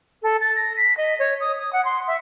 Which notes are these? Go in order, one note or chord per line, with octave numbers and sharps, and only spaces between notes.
A4
A6
A#6
B6
D#5
C#5
D#6
D#6
F#5
C6
E5